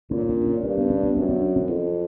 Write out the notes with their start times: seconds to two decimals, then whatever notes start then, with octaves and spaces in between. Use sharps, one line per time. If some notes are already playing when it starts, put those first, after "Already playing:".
0.11 A#2 C#4
0.29 D4
0.47 C#4
0.63 G2 C#4
0.78 B3
0.90 C#4
1.03 B3
1.16 F#2 C4
1.29 D4
1.56 C4
1.69 F2